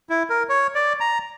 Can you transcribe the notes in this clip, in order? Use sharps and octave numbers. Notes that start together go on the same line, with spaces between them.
E4
A#4
C#5
D5
A#5